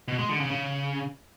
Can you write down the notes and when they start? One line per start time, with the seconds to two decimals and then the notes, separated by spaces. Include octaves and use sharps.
0.08 B2
0.19 G#3
0.29 D3
0.40 C#3
0.51 C#3